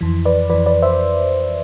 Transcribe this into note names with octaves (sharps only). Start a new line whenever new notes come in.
F2 E3
B4 D5
F2 E3 B4 D5
B4 D5
C5 E5